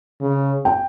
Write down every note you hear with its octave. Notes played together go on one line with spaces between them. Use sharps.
C#3
G5